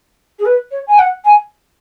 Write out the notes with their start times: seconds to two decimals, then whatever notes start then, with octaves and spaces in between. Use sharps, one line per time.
0.39 G#4
0.45 B4
0.71 C#5
0.87 G#5
0.98 F#5
1.24 G#5